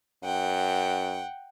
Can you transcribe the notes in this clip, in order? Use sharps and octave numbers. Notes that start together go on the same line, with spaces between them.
F#2 F#5 G5